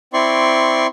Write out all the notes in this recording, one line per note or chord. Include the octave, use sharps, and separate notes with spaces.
C4 E4 D5 C6 C#6